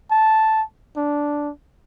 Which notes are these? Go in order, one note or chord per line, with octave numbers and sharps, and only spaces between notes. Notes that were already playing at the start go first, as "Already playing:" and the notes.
A5
D4